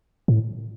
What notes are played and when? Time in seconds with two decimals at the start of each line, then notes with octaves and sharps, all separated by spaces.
0.28 A2